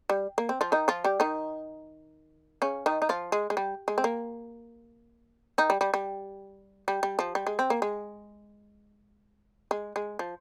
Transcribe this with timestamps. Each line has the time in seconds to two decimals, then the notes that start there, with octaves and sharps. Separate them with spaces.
0.10 G3
0.38 A#3
0.49 C4
0.61 F3 F4
0.72 D#3 D#4
0.88 F3 F4
1.04 G3 G4
1.20 D#3 D#4
2.62 C#3 C#4
2.86 D#3 D#4
3.02 D#4
3.09 F3 F4
3.32 G#3
3.50 G#3
3.57 G3
3.88 G#3
3.98 C4
4.04 A#3
5.58 D#3 D#4
5.70 G3
5.81 G3
5.94 G3
6.88 G3
7.03 G3
7.19 F3
7.35 G3
7.47 G#3
7.59 C4
7.70 A#3
7.82 G#3
9.71 G#3
9.96 G#3
10.19 F3